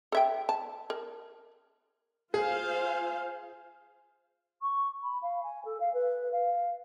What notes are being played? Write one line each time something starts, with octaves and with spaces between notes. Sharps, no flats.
A4 E5 G5
A5
A#4
F4 G#4 C5 F5
C#6
B5
F5
G#5
A4
F5
B4
F5